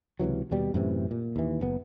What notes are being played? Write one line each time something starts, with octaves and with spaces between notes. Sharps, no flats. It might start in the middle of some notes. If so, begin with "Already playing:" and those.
C#2 C3 E3 F#3
D#2 B2 G3
F#2 A2 C3 E3
A#2
D#2 E3
F#1 B3